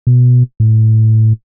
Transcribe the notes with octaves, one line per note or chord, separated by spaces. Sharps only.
B2
A2